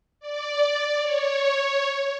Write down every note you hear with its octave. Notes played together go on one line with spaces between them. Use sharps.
D5
C#5